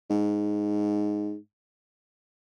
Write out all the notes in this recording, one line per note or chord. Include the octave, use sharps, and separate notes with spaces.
G#2